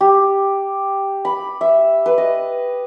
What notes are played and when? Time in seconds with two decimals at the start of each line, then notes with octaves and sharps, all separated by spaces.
0.01 G4
1.25 B5
1.61 E5
2.06 B4
2.18 D#5